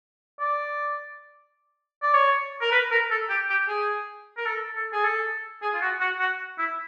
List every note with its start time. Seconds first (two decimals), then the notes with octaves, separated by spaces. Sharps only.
0.40 D5
2.03 D5
2.14 C#5
2.61 A#4
2.72 B4
2.91 A#4
3.11 A4
3.30 G4
3.50 G4
3.68 G#4
4.37 A#4
4.46 A4
4.75 A4
4.93 G#4
5.04 A4
5.62 G#4
5.74 F4
5.82 F#4
6.00 F#4
6.20 F#4
6.58 E4